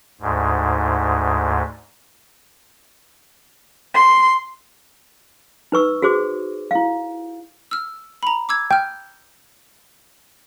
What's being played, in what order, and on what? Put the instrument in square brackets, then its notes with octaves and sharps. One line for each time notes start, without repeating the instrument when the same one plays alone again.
[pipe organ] D2 G#2
[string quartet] C6
[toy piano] D#4 B4 C#6 E6
F#4 G#4 C5 D6
E4 F5
[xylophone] E6 F6
A#5 B5
D6 E6 G#6
[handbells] G5 [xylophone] F6 G6